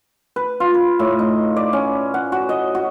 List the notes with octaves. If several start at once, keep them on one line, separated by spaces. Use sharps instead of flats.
B4
F4
B4
A2
D#4
D5
C#4
F#5
F#4
D#5
F#4